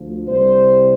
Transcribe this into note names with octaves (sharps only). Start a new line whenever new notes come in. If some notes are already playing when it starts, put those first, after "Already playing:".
Already playing: D2 F3
C2 C3 G3 C5